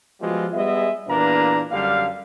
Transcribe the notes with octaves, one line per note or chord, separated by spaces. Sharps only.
F3 G3 G#3 B3 F4 F#4
G3 G#3 B3 G#4 D#5 E5
E2 A#2 A#3 D4 B4 A#5
F#2 D3 G3 F5